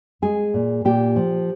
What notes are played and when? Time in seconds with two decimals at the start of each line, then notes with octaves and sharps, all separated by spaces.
0.22 G#3 G#4
0.54 A#2
0.85 A#2 G4
1.16 F3